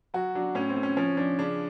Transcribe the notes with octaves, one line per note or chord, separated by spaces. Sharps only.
F#3 F#4
F#3 D4
A2 C#4
C4
A2
C#4
F3 C#4
F3 D4
C#3 D4